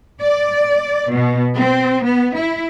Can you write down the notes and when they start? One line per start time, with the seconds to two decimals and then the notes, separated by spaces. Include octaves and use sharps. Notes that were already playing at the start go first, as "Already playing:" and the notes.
0.20 D5
1.11 B2
1.58 C4
2.05 B3
2.38 E4